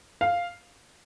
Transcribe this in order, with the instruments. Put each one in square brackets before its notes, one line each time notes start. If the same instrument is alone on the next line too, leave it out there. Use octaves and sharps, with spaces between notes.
[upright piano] F5